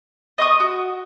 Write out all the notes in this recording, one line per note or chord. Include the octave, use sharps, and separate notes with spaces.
D#5 C#6 D#6
F#4